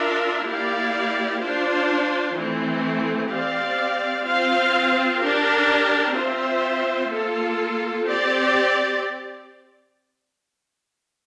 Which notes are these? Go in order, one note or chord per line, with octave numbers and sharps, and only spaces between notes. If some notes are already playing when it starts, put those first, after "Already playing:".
Already playing: D4 F4 A#4 E5
A#3 E4 G4 D5 F5
D4 F4 C5
E3 A3 C4
C4 G4 D5 F5
C4 F4 C5 F5
D4 G4 A#4
C4 F4 C5 E5
A#3 F4 A4
C4 G4 D5